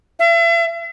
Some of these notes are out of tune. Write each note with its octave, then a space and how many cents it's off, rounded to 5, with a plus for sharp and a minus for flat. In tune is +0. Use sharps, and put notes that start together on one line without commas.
E5 +40